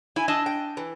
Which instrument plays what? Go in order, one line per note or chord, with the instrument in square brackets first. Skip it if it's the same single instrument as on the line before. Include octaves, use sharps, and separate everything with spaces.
[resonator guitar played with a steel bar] E4 [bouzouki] G#5
[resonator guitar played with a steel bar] D4 D#5 A5 [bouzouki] E5
[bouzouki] G5
E3